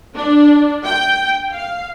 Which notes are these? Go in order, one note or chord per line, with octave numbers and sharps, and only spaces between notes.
D4
G5
F5